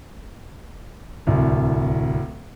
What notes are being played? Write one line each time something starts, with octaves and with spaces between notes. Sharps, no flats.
D1 C2